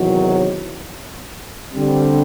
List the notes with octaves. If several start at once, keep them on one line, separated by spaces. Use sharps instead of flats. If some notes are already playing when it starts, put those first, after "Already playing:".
Already playing: E2 C3 D#3 F#3
D3 G3 C4